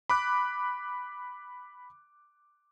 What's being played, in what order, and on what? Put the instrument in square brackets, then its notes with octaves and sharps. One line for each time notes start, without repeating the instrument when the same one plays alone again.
[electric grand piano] B5 D6 F#6